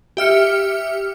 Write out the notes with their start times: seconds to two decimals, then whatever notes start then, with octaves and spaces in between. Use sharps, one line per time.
0.17 G4 E5 F6 C#7